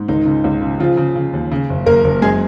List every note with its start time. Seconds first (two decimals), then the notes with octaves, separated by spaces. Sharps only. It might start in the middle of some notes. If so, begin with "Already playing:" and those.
Already playing: G#2
0.08 C#2 D#3 D#4
0.26 C#3
0.44 C#2
0.61 C#3
0.80 C#3 F3 F4
0.97 C#3
1.16 C#3
1.33 D#2
1.52 C#3
1.70 F#1
1.86 F#1 A#3 A#4
2.04 F#1
2.22 F#2 G#3 G#4